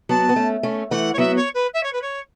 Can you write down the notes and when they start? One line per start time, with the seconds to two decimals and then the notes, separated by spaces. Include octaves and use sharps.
0.09 F#3 B3 A5
0.29 B3
0.36 A3 C#4
0.63 A3 C#4
0.90 E3 A3 F#5
1.13 C#5
1.18 F#3 B3 E5
1.36 C#5
1.54 B4
1.73 E5
1.83 C#5
1.92 B4
2.01 C#5